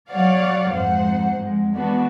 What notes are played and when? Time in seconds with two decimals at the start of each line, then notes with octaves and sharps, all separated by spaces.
0.11 F#3 C#5 D5 F5 F#5
0.70 F2 G#2 C5 F#5
1.37 F2 G#3
1.75 E3 G#3 B3 D4 F#4